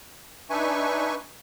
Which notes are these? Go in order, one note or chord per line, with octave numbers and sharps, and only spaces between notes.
D4 D#4 B4 E5 G#5 C#6